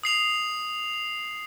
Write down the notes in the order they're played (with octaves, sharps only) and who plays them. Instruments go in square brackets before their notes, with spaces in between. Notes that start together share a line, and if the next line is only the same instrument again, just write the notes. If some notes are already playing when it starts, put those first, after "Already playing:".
[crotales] D#6 C7 F7